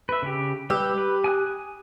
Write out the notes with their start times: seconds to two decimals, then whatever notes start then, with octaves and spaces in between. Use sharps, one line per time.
0.09 B4 E5
0.22 C#3 G4
0.70 G3 G4 B4 E6
0.98 B4
1.24 G#5 D#6 F#6